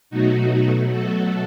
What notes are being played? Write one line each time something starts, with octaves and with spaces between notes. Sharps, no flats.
B2 F#3 A3 D#4 F#4
F#4 A4